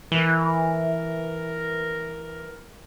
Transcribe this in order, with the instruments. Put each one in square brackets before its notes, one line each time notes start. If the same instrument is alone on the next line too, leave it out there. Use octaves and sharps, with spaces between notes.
[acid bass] E3 [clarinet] A#4